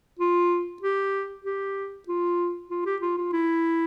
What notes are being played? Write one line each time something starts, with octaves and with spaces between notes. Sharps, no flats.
F4
G4
G4
F4
F4
G4
F4
F4
E4